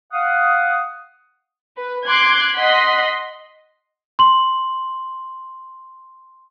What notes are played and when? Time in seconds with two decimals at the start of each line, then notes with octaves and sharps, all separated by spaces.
0.12 F5 F#5 D#6
1.77 B4
2.07 C6 D6 F#6 G#6
2.55 D#5 F#5 C6 B6
4.19 C6 F#7